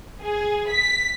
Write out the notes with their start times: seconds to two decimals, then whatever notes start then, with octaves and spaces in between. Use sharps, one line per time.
0.23 G#4
0.70 B6